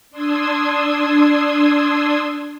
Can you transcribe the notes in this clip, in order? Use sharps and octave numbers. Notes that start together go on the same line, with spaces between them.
D4 C6 D#6 E6 G#6